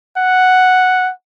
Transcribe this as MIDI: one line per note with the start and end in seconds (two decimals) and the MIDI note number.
0.18 1.12 78